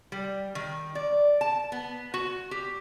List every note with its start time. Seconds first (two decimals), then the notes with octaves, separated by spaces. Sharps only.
0.12 G3
0.55 D#3
0.95 D5
1.41 A5
1.72 B3
2.14 F#4
2.51 G4